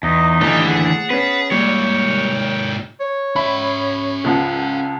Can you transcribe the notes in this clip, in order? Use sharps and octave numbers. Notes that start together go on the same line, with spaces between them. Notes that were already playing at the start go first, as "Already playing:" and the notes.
E2 D#4 D#5
D#2 A2 D3 E3 G4 B5
G#4 F#5 A5
B3 C#4 B4
G#2 G3 A#3 C#5 G5
C#5
C#4 E5 B5
C#2 F3 F#5